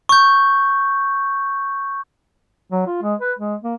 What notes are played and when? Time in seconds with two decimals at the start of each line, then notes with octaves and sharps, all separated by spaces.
0.09 C#6 G6
2.71 F#3
2.87 F4
3.02 G#3
3.20 B4
3.39 G#3
3.63 A#3